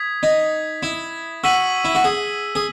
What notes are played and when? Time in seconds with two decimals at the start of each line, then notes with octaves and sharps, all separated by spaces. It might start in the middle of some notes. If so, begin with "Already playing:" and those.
Already playing: D#6 G#6 B6
0.23 D#4
0.83 E4
1.44 F#4 E6 B6 D#7 F#7
1.85 E4
1.95 F#4
2.04 G#4
2.55 G#4